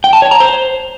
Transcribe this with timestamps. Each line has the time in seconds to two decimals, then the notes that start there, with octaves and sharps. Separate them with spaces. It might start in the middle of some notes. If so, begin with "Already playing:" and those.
0.04 G5
0.13 A5
0.22 C#5
0.31 A#5
0.40 C5